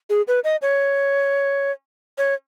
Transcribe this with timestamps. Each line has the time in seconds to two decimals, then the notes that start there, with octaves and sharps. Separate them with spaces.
0.10 G#4
0.28 B4
0.44 D#5
0.62 C#5
2.18 C#5